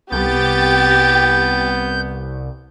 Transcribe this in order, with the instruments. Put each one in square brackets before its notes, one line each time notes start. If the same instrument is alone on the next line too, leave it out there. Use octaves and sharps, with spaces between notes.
[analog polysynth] C2 [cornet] B3 [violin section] G4 G5 A6 [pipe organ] G6